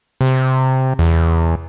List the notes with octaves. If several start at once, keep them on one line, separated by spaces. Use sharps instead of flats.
C3
E2